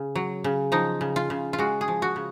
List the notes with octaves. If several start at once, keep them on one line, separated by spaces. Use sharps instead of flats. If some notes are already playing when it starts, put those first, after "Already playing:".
Already playing: C#3
F#3
C#3
F3 D#4
C#3
F4
C#3
F4
G#3 F#4
G#4
F3
F#4
C#3